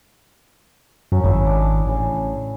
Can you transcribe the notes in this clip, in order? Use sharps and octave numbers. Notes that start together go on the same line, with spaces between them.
F#2 F#3 C#4
G#1 C#3 E4
D4
A1 C#3 G#5